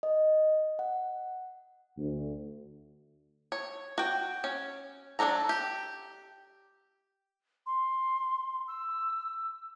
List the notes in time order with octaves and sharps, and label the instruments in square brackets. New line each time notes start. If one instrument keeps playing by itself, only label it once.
[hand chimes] D#5
F#5
[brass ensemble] D2
[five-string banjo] C#5
F#4 G5
C#4
F#3 C4 D4 A4 A#5
G4
[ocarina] C6
E6